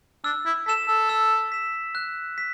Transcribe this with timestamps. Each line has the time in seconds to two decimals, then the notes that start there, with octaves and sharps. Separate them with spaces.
0.24 D4 E6
0.46 E4
0.66 A4 B6 E7
0.88 A4
1.09 E6
1.52 B6 E7
1.95 F#6
2.38 B6